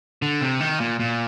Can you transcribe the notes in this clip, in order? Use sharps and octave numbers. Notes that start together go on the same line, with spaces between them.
D3
C3
D#3
A#2
A#2